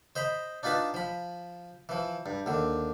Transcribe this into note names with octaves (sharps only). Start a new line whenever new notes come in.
C5 D#5 A#5 B5
D4 D#4 F4 B4 A5
F3 B5
E3 F3
G2
D#2 D3